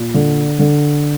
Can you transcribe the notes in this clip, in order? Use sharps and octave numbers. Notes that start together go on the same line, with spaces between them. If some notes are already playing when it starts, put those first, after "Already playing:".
Already playing: A#2
D3
D3